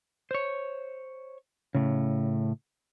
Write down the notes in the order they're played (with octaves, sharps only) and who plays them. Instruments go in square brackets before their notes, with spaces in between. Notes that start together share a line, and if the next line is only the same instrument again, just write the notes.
[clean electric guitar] C5 C#5
A2 C#3